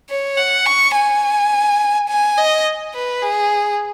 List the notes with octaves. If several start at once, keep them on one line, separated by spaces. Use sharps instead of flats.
C#5
F#5
C#6
G#5
G#5
D#5
B4
G#4